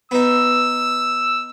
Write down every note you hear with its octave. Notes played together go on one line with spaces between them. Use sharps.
B3 D#4 E6